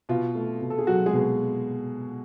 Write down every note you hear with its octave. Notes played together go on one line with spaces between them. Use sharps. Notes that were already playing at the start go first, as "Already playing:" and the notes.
B2 F4
A3
B2
A4
G#4
F#3 F#4
G#3 G#4
B2